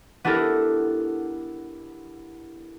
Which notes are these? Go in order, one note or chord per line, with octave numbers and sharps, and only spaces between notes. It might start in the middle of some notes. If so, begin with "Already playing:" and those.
B3 D4 E4 G4 A4 A#4